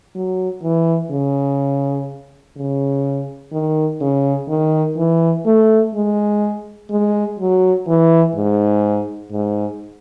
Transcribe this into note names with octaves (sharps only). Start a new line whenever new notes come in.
F#3
E3
C#3
C#3
D#3
C#3
D#3
E3
A3
G#3
G#3
F#3
E3
G#2
G#2